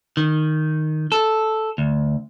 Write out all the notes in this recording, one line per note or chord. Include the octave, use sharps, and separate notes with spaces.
D#3
A4
D2